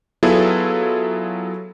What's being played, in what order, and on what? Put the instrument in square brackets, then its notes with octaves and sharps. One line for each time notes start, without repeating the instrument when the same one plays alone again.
[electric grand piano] F#3 B3 E4 F4 G#4 A4